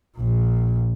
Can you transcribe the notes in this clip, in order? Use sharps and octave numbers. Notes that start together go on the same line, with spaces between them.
A#1 A#2